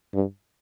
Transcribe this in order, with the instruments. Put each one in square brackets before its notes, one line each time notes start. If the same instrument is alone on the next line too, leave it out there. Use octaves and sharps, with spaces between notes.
[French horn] G2